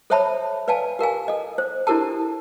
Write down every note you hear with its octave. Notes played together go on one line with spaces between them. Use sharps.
A4 C5 C#5 E5 A5 B5
B4 D5 F5 G#5 A5
G4 A#4 F5 G#5
A4 D#5
C5
D4 E4 G4 A4 A#4 A5